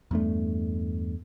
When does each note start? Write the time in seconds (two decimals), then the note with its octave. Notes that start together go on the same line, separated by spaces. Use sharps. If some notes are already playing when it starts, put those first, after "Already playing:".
0.11 E2 G2 A3